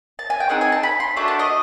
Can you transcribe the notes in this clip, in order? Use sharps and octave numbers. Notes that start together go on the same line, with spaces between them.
A5
G#5
G5
C4 D#4 G#4 F#5
G#5
A5
B5
C6
A3 D4 F#4 A4 B5
A5
D#5